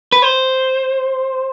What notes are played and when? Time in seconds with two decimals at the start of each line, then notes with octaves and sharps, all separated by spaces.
0.12 B4
0.22 C5